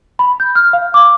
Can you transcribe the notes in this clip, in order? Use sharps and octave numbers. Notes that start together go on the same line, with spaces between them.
B5
G6
F6
F5
D6